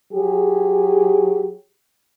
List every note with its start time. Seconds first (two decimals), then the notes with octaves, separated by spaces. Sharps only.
0.13 F#3 G4 G#4